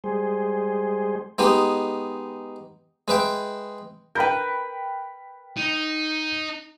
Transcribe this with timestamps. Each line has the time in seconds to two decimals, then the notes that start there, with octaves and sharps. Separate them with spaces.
0.04 G3 G#3 G#4 C5
1.38 G#3 B3 D#4 G4
3.08 G#3 B4 E5 G5
4.15 A#4 B4 G5 B5 G6
5.57 D#4